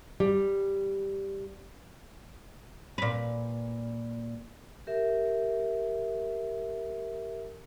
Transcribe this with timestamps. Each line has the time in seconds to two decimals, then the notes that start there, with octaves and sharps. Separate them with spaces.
0.20 G3
2.98 A#2 B4
4.87 G4 A#4 E5